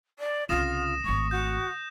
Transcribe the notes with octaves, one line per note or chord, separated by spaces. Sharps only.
D5
C2 C#3 F4 D#6 A#6 E7
G#1 A3 C#6
F#4 G6